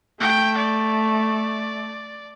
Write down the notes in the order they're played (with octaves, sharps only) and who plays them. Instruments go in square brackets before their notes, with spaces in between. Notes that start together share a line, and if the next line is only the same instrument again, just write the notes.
[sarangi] A3 [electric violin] G5
[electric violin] D5